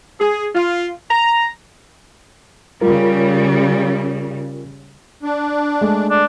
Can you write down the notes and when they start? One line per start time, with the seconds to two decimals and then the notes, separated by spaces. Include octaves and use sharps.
0.20 G#4
0.55 F4
1.11 A#5
2.81 C#3 G3 F4 A#4
5.23 D4
5.81 G#3 A3
6.10 D4